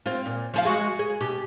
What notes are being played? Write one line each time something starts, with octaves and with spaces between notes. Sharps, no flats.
C4 F4
A#2
F3 G#4 F5
G#3 F#4 G#4
G#4
B2 G4